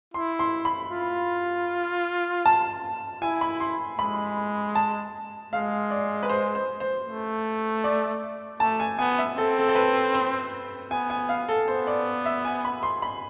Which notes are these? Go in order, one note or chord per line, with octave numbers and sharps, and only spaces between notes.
E4 C6
C6
B5
F4
A5
E4 G#5
B5
C6
G#3 B5
A5
G#3 F5
D5
B4
C5
C5
C5
A3
D5
A3 A5
G#5
B3 G#5
E5
C4 A4
A4
A4
B4
C5
B3 G#5
G#5
F5
A4
B3 C5
D5
E5
G#5
B5
C6
B5